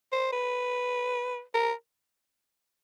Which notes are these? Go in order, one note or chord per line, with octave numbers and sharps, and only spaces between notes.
C5
B4
A#4